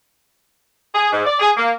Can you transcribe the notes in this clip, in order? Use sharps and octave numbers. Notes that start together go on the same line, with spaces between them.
G#4
G#2
D5
G#4
A#3